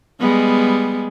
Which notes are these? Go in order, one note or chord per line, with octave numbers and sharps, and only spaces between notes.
G3 G#3 B3